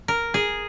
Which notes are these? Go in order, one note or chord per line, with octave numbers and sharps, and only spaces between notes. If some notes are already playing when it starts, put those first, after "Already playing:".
A#4
G#4